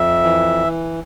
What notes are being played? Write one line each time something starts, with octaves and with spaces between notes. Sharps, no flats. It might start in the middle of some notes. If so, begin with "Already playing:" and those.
Already playing: F2 E5
E3